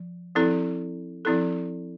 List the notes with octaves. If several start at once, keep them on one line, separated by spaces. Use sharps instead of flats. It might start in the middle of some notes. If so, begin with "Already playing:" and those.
Already playing: F3
F3 C4 E4 A4
F3 C4 E4 A4